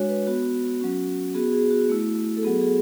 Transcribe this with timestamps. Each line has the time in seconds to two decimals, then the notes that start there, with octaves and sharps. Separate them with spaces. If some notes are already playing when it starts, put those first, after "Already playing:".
Already playing: G#3 D4 F#4 C#5
0.09 B4
0.27 B3 F#4
0.80 F#3 C#4 F#4
1.35 B3 F#4 G#4
1.53 G#4
1.71 F#4
1.89 A3 E4
2.37 A4
2.43 F#3 B3 F#4 G#4
2.61 G#4